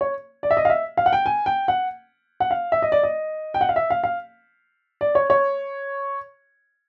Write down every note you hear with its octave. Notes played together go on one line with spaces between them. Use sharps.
C#5
D5
E5
D#5
F5
E5
F5
F#5
G5
G#5
G5
F#5
F#5
F5
E5
D#5
D5
D#5
G5
F#5
F5
E5
F5
F5
D5
C#5
C#5